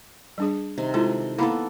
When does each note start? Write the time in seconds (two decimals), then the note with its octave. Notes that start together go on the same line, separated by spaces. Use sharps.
0.38 G3 D4 G#4
0.78 C3 D#3
0.94 G#3 E4 F4 A4
1.38 A#3 B3 E4 A4 F5 B5